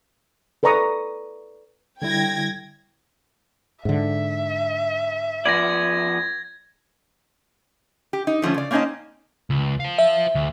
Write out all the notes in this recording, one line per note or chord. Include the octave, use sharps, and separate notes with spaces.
A4 B4 D5 A#5 C#6 D#6
D3 G3 E4 G5 G#6 A#6
G#2 D3 E5
F3 B3 D5 G#6 A#6
G4
D#4
D3 F3 A3 C#4
C#3 D5
A#3 C4 C#4 D#4 D#5 A5
C#2
C5 F5
E5
D2